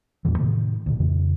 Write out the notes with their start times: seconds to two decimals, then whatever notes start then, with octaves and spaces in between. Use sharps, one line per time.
0.25 E2 G2 A#2 E3
0.38 A2 C3 D#3 A3
0.86 D2 A#2
1.00 F2 C#3 E3